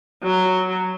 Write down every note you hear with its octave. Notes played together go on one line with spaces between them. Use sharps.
F#3